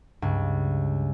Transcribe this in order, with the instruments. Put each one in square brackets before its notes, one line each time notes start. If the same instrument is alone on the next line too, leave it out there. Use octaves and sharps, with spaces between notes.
[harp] C#2 G2